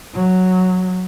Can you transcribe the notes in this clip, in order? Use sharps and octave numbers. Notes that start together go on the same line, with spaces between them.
F#3